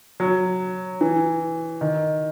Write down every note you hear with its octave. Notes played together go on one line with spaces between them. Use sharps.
F#3
E3
D#3